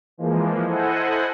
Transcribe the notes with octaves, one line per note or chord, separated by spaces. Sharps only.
E3 F3 G#3 A#3
E4 A4 C5 D#5 F#5 G#5